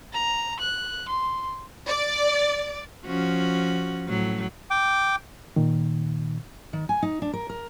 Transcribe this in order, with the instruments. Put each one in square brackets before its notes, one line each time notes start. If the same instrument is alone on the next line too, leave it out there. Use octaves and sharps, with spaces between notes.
[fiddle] A#5
F#6
C6
[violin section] D5
[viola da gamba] F3 C#4 F#4
A2 F#3
[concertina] G5 D6
[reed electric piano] A#2 D#3
[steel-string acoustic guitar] D#3
G#5
D#4
D4
A#4
A#4